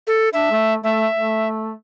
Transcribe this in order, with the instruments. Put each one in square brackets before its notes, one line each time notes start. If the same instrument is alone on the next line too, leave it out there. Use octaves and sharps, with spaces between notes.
[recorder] A4
[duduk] D4 [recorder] E5
[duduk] A3
[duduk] A3 [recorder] E5
[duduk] A3